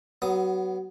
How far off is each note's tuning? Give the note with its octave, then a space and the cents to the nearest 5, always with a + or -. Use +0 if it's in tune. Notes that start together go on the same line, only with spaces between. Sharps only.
F#3 +25 B3 +0 D#6 +10